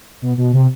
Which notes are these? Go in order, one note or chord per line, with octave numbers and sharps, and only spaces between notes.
B2
B2
C3